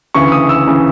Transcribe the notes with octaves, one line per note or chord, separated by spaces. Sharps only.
D2 C#3 E3 C#6
D#6
E6
C#3 E3